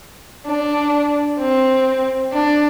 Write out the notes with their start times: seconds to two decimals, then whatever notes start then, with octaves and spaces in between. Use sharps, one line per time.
0.46 D4
1.40 C4
2.33 D4